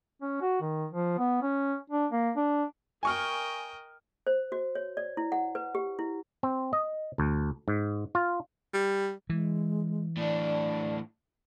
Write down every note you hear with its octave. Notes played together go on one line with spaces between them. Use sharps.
C#4
F#4
D#3
F3
B3
C#4
D4
A#3
D4
A#4 D#5 G5 G#5 C#6 F6
C5
F#4
C#5
D5
E4
F#5
B4
G4
E4
C4
D#5
D2
G#2
F4
G3
E3 G#3
A2 D4 D5